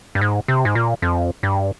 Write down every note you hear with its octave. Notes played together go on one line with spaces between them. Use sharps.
G2
G#2
C3
G#2
A#2
F2
G2